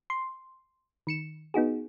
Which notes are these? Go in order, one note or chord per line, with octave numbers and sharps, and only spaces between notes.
C6
D#3 C#7 E7
B3 D#4 F#4 G#4